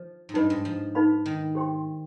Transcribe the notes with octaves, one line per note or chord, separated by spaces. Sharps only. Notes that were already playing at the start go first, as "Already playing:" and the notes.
Already playing: F3
G#2
G2 D#4 B4 D#5
G#2
F3
D#4 B4 F5 B5
D#3
G4 C5 G5 C6